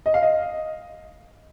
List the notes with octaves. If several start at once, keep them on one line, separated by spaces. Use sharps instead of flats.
D#5
F5
D#5